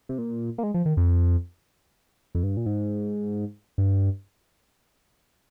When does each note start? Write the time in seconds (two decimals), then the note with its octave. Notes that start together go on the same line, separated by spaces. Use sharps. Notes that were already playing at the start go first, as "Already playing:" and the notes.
0.09 C3
0.18 A#2
0.58 A#3
0.63 G#3
0.74 F3
0.85 D#3
0.97 F2
2.35 F2
2.43 G2
2.57 A#2
2.66 G#2
3.78 G2